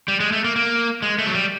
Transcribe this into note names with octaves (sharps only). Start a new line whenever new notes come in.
G3
G#3
A3
A#3
A#3
G#3
A3
F#3
G3